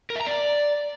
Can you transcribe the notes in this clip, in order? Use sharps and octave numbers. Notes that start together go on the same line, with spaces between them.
A#4
E5
A#5
D5